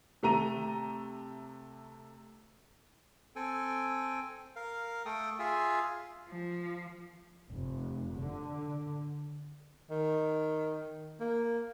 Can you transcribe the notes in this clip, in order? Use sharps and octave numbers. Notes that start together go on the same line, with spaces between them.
C3 A3 A#5 D#7
C4 A4 G5 G#5
A#4 F5
A3 A4 G5 D#6
F4 G#4 E5 F5 G#5
F3
F1
D3
D#3
A#3